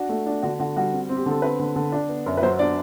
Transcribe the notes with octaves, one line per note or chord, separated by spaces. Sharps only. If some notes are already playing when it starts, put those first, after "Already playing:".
Already playing: D4 F#4
A3
D4
D3 F#4
D3 F#4
G3 F#4
C4
C4
G4
D3 A4
C4 B4
D3
D3
D4
B3
F#2
B4
F#3 C5
D4 D5